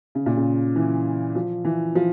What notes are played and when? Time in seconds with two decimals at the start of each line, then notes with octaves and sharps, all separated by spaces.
0.15 C#3
0.26 A#2
0.37 C#3
0.76 E3
1.35 F3
1.65 E3
1.95 F3